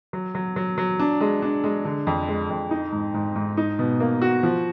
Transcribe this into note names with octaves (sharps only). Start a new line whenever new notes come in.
F#3
F#3
F#3
F#3
D4
G#3
D4
G#3
D3
F2
G#3
F2
D#4
G#2
G#2
G#2
D#4
B2
A#3
F#4
F3